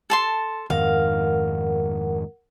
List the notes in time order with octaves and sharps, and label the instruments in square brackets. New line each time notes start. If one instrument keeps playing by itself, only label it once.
[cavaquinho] A4 A5 C6
[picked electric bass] F2 G#2 D#3 [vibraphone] A#4 F#5 [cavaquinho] F5